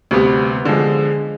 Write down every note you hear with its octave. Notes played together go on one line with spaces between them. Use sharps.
D2 C3 G3 B3
D3 F3 G#3